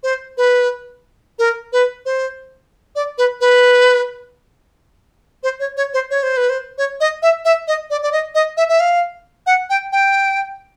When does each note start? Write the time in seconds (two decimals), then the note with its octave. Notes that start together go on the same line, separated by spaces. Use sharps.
0.03 C5
0.37 B4
1.39 A#4
1.72 B4
2.05 C5
2.95 D5
3.18 B4
3.41 B4
5.43 C5
5.60 C#5
5.77 C#5
5.93 C5
6.10 C#5
6.23 C5
6.37 B4
6.49 C5
6.78 C#5
7.00 D#5
7.22 E5
7.45 E5
7.67 D#5
7.90 D5
8.02 D5
8.12 D#5
8.34 D#5
8.57 E5
8.69 E5
8.80 F5
9.46 F#5
9.70 G5
9.92 G5